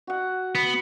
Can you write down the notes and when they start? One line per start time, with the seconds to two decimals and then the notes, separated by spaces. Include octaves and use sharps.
0.07 F#4 F#5
0.55 B3